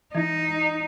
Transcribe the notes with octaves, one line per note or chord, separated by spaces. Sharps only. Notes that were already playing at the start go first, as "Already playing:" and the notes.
E3 D#4